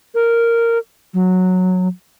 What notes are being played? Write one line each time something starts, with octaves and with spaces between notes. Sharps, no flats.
A#4
F#3